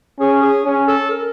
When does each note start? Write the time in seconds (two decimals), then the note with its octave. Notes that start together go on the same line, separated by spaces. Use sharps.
0.20 C#4 G#4
0.42 G#4
0.65 C#4
0.88 A4
1.10 A#4